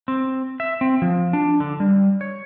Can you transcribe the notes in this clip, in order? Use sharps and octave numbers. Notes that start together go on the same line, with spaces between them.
C4
E5
C4
F3
D4
D3
G3
C#5